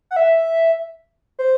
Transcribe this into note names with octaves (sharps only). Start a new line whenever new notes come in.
F#5
E5
C5